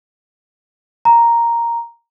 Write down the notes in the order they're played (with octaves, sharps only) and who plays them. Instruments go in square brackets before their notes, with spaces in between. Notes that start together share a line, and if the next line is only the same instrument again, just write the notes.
[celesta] A#5